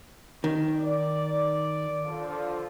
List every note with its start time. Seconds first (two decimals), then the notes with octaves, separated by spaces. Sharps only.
0.44 D#3
0.77 D5
2.05 D3 F3 F4